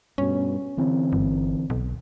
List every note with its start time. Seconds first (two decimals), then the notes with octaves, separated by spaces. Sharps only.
0.18 G2 B2 C#4
0.77 D3 E3 C4
1.13 G1
1.70 B1